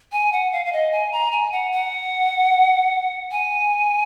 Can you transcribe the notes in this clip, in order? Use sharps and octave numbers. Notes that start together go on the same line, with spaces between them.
G#5
F#5
F5
F5
D#5
G#5
A#5
G#5
F#5
F#5
G#5